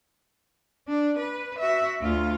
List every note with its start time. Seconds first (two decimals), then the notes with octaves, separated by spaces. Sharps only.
0.88 D4
1.18 B4
1.59 F#4 E5
2.01 D2 F4